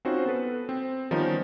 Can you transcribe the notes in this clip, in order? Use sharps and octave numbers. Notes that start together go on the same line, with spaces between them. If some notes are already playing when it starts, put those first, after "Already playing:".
C4 C#4 D#4 F4 F#4 C5
B3 A4 B4
C4
D#3 F3 G3 B3 C#4 D#4